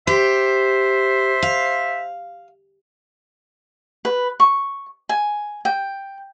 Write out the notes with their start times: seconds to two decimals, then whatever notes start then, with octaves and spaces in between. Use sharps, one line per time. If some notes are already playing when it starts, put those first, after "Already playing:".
0.07 G4 C5 E5
1.43 F5
4.05 B4
4.40 C#6
5.09 G#5
5.65 G5